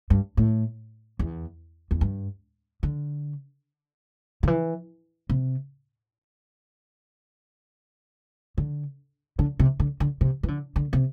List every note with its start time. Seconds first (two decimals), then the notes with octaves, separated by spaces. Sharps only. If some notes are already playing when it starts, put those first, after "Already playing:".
0.10 G2
0.37 A2
1.19 E2
1.91 E2
2.01 G2
2.83 D3
4.43 D3
4.47 E3
5.30 C3
8.58 D3
9.39 D3
9.59 C3
9.80 D3
10.00 D3
10.21 C3
10.43 E3
10.48 D3
10.76 D3
10.93 C3